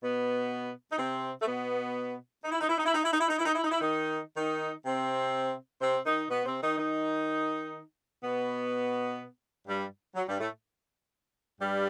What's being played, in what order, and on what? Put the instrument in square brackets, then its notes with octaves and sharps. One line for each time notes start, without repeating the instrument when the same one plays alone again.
[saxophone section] B2 B3
D#4
C3 C4
A3
B2 B3
D#4
E4
D#4
E4
D#4
E4
D#4
E4
D#4
E4
D#4
E4
D#4
E4
D#4
E4
D#3 D#4
D#3 D#4
C3 C4
C3 C4
D#3 D#4
B2 B3
C3 C4
D#3 D#4
D#3 D#4
B2 B3
G2 G3
F#3
G2 G3
A2 A3
G2 G3